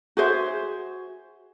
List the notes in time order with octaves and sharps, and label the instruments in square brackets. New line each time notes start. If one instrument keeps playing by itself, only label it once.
[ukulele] F#4 G#4 C5 E5